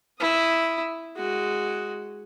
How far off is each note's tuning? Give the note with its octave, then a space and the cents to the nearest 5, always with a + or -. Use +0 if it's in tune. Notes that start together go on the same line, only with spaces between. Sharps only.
E4 +0 D#6 +0
G#3 +0 F#4 +0